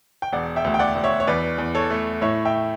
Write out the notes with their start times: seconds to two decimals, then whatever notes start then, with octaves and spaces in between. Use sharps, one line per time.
0.22 G5
0.33 E1 D5 F#5
0.56 E5 G5
0.64 D2
0.74 G5
0.79 D5 F#5
0.95 D2
1.04 C#5 E5
1.20 C#5
1.27 E2 B4 D5
1.58 E2
1.75 A4 C#5
1.91 A3
2.21 A2 C#5 E5
2.45 E5 G5